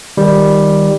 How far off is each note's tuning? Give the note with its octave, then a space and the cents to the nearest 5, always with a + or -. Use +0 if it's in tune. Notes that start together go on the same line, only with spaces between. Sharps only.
D#3 +0 G3 +5